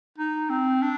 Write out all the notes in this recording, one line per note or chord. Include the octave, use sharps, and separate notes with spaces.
D#4
C4
D4